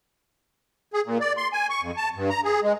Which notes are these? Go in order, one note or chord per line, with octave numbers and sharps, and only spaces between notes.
G#4
A#2
D5
C6
G#5
C#6
F2
A5
G2
A#5
G#4
G#3